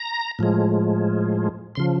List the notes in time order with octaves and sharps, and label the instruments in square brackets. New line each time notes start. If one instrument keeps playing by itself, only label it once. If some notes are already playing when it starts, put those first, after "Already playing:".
Already playing: [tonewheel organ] A#5
A2 F3 G#3
C#3 F3 C6